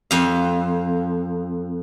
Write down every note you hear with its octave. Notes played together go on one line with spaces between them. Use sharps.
F2 F5